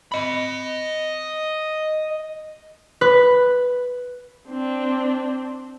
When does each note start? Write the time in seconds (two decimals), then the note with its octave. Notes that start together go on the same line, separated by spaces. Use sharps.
0.12 D#5 B5
3.01 B4
4.49 C4 D4